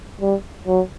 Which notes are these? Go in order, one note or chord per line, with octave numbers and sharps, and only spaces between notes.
G3
F#3